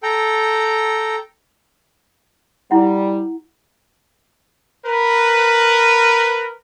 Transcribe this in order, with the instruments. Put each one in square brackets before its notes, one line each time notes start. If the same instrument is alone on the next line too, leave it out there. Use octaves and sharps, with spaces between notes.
[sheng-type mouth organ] A4 G5 A#5
[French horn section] G3 [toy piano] E4 F#5
[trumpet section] A#4 B4